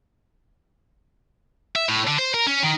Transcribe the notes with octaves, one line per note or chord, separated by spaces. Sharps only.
E5
A2
D3
C5
A#4
C#4
D#3